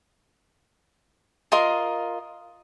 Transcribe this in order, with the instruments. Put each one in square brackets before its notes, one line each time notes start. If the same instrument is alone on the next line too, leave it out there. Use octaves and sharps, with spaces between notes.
[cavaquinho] F4 A#4 D#5 C6